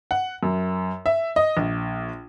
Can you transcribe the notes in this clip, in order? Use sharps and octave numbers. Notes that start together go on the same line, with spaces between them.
F#5
F#2
E5
D#5
A#1